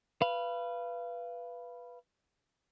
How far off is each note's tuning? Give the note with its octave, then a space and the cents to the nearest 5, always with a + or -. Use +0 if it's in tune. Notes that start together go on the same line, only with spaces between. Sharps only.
B4 -5 F5 -25